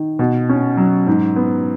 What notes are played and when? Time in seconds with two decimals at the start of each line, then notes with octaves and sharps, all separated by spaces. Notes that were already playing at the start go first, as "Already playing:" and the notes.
Already playing: D#3
0.19 B2
0.49 C#4
0.77 F#3
1.07 G#2
1.36 B3